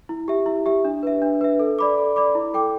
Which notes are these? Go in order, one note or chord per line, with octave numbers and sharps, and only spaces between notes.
E4
G4 E5
E4
G4 E5
D4
B4 E5
D4
B4 E5
A4
D5 B5 D6
A4
D5 B5 D6
E4
A4 G5 D6